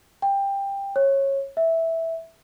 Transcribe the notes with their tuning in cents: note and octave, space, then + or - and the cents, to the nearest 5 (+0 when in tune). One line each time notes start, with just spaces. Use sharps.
G5 +15
C#5 -20
E5 -5